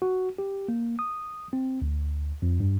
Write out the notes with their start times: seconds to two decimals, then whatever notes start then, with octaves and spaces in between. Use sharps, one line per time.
0.02 F#4
0.38 G4
0.69 A#3
0.99 D#6
1.53 C4
1.82 D2
2.42 F2
2.60 G2